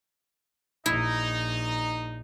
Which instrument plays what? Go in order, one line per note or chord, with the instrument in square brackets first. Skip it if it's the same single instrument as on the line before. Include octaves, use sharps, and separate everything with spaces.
[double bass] A#1 [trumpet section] D#4 [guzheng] E4